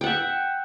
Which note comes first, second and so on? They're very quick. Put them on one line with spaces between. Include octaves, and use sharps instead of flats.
G5 F#5 E5